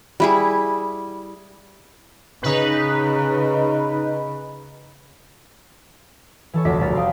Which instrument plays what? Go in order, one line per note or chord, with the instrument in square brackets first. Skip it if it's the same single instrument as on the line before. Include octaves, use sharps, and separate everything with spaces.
[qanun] G3 E4 G#4
[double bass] C#3 [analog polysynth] D#4 B4
[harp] E3 A4 C#5
F1 D2 E5 D6 A#6 B6
F1 C2 B2 A#4 A6 B6
F5 G5 D#6